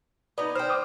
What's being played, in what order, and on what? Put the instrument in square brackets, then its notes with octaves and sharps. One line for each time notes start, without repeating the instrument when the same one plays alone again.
[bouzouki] B3 D#4 [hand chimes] D5
[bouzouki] C5 G5 [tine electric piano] F6
[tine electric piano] D6 D#6 F6